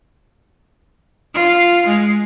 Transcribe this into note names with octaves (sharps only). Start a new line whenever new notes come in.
F4
G#3